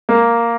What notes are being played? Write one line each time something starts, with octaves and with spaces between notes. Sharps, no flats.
A#3